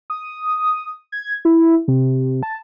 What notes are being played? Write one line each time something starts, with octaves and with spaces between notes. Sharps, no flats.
D#6
G#6
E4
C3
A5